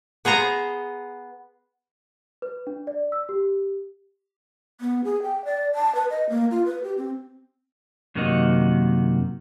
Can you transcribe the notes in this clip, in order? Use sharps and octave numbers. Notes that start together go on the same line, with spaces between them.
B3 G#4 C5 A#5
B4
D4
D5
E6
G4
B3
G#4
G5
D5
A5
B4
D#5
A#3
F4
B4
G4
C4
F#2 C3 D#3 A#3 F#4 D#5